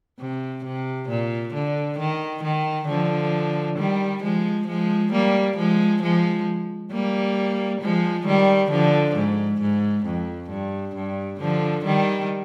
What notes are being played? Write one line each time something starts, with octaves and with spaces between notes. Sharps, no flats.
C3
C3
A#2
D3
D#3
D#3
D3 F3
D#3 G3
F3 G#3
F3 G#3
G3 A#3
F3 G#3
F3 G#3
G3 A#3
F3 G#3
D#3 G3
D3 F3
G#2
G#2
F2
G2
G2
D3 F3
D#3 G3